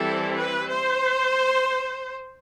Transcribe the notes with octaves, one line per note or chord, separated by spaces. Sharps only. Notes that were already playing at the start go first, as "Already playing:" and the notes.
Already playing: E3 G3 C4 E4 A4
B4
C5